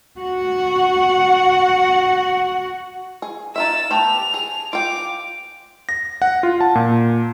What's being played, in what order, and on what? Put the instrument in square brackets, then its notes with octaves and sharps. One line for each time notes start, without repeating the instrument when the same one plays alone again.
[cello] F#4 F#5
[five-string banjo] G#4
[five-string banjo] D#4 F4 E5 [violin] E6 A6
[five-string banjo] A3 B3 G4 [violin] F7
[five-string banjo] G#4
[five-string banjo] F4 G5 [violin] D6
[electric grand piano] A#6
F#5
F4
A5
A#2